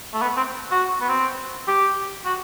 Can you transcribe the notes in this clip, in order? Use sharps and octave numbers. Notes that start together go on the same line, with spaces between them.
A3
B3
C4
F#4
B3
C4
G4
F#4